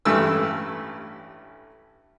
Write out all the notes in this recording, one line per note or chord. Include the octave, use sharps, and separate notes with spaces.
A1 G2 E3 A3 E6